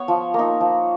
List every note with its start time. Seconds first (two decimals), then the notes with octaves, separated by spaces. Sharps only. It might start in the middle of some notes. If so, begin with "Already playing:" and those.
Already playing: B3 C#5
0.08 F3
0.34 A#3 D#4
0.61 F3